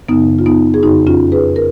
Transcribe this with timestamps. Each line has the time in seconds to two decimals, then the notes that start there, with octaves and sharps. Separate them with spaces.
0.09 F#2 C#3 B3 D#4
0.39 F4
0.46 B3 D#4
0.74 G#4
0.83 F2 C#3 D#4 F#4
1.07 C#4 F4
1.32 G#4 B4
1.56 A#4